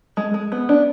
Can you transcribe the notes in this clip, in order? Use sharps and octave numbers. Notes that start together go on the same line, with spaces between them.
G#3
G#3
B3
D4